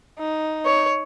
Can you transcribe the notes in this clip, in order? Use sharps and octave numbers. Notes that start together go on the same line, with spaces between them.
D#4
C#5